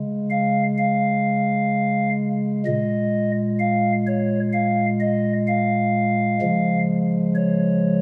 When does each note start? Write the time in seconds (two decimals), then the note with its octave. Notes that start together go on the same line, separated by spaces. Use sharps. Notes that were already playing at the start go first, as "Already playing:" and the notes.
Already playing: C#3 G#3
0.30 F5
0.78 F5
2.66 A#2 G#3 D#5
3.60 F5
4.07 C#5
4.53 F5
5.00 D#5
5.48 F5
6.41 C#3 F3 G#3
7.35 C#5